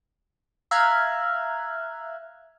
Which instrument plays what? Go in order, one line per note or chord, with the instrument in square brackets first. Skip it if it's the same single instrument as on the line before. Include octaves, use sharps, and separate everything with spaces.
[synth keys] E5 F5 A#5 F6 F#6 G#6